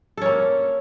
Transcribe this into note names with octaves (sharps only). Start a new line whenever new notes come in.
A#3 C#4 A4